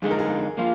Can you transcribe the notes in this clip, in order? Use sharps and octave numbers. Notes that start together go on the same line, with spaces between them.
F2 D3 G#3 D#4 G#4
A#4
G#4
F3 A#3 F4